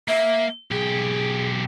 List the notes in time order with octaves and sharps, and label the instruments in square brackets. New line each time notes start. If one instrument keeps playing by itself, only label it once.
[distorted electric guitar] A#3 [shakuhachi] E5
[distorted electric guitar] B1 G4 [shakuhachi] G#4